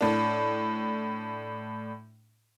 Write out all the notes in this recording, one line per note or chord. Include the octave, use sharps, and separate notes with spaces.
A2 D4